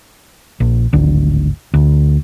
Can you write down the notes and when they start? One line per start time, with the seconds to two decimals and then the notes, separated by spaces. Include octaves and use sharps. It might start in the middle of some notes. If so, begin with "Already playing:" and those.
0.60 A#1
0.93 D1 G#1 D2
1.74 D2